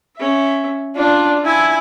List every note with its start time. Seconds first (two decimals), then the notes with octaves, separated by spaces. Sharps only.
0.17 C#4 E5
0.97 D4 F4
1.45 E4 G#5